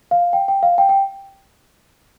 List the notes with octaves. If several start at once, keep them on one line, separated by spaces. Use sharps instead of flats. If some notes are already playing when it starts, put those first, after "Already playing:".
F5
G5
G5
F5
G5
G5